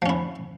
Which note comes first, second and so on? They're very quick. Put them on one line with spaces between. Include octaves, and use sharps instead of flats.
F3 C#4 E4